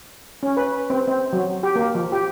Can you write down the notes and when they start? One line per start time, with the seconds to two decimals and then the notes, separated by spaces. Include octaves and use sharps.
0.43 C#4
0.57 B4
0.90 C4
1.07 C4
1.33 F#3
1.63 G4
1.76 A#3
1.95 F3
2.12 G4